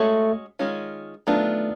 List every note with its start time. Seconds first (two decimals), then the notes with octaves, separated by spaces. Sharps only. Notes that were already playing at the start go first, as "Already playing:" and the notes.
Already playing: G#3 A3 C#4 F#4
0.59 D#3 G#3 C#4 F4
1.27 D#3 F#3 A3 B3 D4 F4